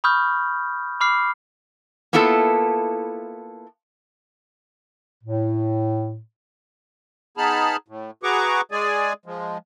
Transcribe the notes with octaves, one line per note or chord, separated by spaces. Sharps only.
B5 C#6 D#6 F6 G6
B5 D6 F6 C7
A#3 B3 E4 F4 A4
A2
B3 D#4 G#4 A5 B5 F6
A2
F#4 G#4 B4 A#5 C#6 D6
G#3 G#4 D5 G#5
F3 G#3